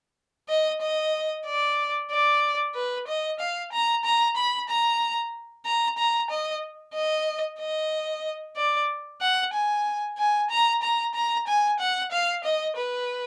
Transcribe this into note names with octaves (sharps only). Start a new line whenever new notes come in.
D#5
D#5
D5
D5
B4
D#5
F5
A#5
A#5
B5
A#5
A#5
A#5
D#5
D#5
D#5
D5
F#5
G#5
G#5
A#5
A#5
A#5
G#5
F#5
F5
D#5
B4